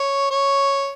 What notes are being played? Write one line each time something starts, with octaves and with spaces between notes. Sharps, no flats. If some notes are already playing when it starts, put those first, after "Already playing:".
Already playing: C#5
C#5